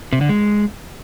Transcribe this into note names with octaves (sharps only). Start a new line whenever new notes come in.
C3
D3
G#3